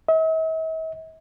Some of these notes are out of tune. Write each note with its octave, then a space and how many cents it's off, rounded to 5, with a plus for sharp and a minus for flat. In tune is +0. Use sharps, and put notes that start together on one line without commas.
E5 -45